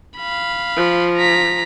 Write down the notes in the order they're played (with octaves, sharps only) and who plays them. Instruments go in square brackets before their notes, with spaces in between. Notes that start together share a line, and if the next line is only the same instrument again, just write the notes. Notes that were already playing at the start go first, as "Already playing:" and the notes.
[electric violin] F5 B5
[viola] F3
[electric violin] A#5 B6